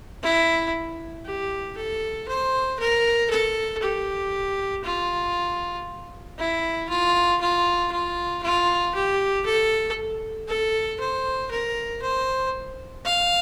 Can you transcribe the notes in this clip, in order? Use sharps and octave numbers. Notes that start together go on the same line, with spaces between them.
E4
G4
A4
C5
A#4
A4
G4
F4
E4
F4
F4
F4
F4
G4
A4
A4
C5
A#4
C5
F5